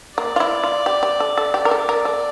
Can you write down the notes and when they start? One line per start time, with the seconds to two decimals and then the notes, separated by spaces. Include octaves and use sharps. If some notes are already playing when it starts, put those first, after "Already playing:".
0.18 A#3 D5
0.36 F4
0.40 E4
0.64 F4
0.86 G4
1.03 G4
1.20 A4
1.38 A4
1.54 G4 D5
1.65 A#4
1.71 A4
1.89 A#4
2.05 A4